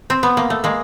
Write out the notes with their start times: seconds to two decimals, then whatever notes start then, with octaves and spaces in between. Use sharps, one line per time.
0.10 C4
0.23 B3
0.37 A#3
0.50 A3
0.64 G#3 A#3